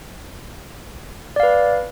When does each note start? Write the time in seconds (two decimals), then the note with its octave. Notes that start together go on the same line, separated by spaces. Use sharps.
1.36 D5
1.40 F5
1.43 B4